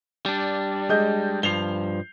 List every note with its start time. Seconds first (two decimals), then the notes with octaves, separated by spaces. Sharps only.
0.26 G3 D4
0.89 G#3 D#5 G6
1.43 G2 F3 C7 F7 G7